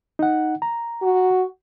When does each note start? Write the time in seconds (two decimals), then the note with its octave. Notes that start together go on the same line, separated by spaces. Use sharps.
0.19 D#4 F#5
0.62 A#5
1.02 F#4